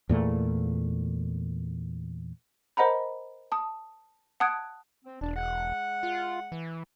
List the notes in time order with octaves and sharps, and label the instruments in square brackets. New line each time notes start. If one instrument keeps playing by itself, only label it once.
[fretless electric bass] E2 A#2 A3
[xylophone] A#4 C5 D#5 F#5 A#5 B5
A5 D#6
F#5 A5 D#6 F#6 G#6 D7
[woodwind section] C4
[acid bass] E1 [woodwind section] D4
[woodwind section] G#3 F#5
[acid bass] F4
E3